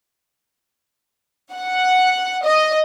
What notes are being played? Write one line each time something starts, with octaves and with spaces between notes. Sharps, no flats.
F#5
D#5